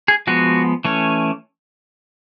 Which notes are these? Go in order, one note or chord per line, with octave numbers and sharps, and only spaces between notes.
G#4
F3 G#3 B3 F#4
E3 A3 C#4